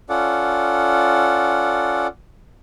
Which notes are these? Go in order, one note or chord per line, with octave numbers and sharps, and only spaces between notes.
C#4 F4 A4 D5 F#5